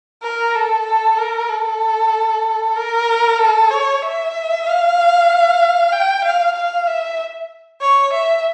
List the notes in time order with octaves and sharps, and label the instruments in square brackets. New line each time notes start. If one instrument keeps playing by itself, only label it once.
[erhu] A#4
A4
A4
A#4
A4
A#4
A4
C#5
E5
F5
G5
F5
F5
E5
C#5
E5